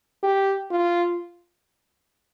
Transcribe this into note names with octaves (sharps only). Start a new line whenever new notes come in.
G4
F4